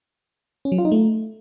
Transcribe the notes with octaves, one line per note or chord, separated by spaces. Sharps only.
C#4
F#3
F4
D#4
A3